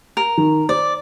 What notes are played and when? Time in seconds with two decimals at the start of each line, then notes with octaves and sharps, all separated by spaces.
0.17 A#4
0.38 D#3
0.69 C5 D5